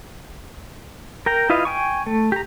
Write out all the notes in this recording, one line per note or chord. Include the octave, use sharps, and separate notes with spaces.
A#4 G5 A#5
E4 F4 B4 D#5 F5
G5 G#5 C#6
A3
G4 A#5